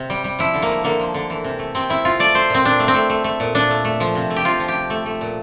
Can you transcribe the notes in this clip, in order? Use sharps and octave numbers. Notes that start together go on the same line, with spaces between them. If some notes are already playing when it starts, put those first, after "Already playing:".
Already playing: C3
G3
G3
F3 E4
D3
A#3
A3
D3 A#3
F3
D3
E3
C3
A3
C3 C4
E3 E4
C3 F4
A3 D5
A3 C5
A#2 C4
A#2 D4
A3
C4
A3
A3
A3
A#2
A#2 D4
A3
A3
F3
C3
A3
G4
C3 F4
F3
G4
C3
A3
A3
A#2